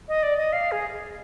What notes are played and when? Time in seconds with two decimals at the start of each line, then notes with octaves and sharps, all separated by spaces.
0.08 D#5
0.23 D5
0.37 D#5
0.53 F5
0.72 G#4